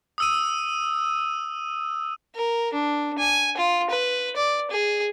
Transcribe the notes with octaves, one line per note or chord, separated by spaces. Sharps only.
D#6 E6 D#7
A#4
D4
G#5
F4
B4
D5
G#4